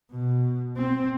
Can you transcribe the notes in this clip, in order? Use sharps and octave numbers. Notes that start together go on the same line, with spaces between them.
B2
C4